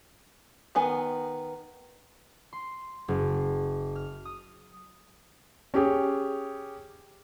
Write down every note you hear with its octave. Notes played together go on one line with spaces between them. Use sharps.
D#3 B3 G#5
C6
F#1
F6
D#6
C#4 G4 G#4